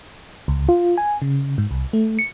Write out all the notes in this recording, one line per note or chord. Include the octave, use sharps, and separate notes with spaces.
C#2
F4
G#5
C#3
G#2
C2
A3
C#7